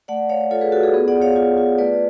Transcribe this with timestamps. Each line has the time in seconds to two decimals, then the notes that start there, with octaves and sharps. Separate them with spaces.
0.08 A3 D5 F#5
0.29 A3 C#5 F5
0.51 F4 A4 C#5
0.61 G#4 B4
0.72 F4 F#4 A4
0.83 G#4
0.94 B3 G#4
1.08 D5 F#5
1.15 B3
1.22 C#5 F5
1.36 F4
1.57 F4
1.78 A3 B4 D5